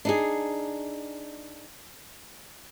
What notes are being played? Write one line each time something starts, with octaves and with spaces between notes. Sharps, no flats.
D4 D#4 G#4